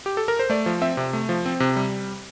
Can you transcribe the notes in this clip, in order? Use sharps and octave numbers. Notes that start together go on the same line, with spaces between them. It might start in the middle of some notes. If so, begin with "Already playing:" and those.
G4
A4
A#4
C5
A3 D5
F3
C4 E5
C3
A3
F3
C4
C3
G3